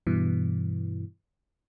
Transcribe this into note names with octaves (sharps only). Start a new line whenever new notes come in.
G2 B2 E3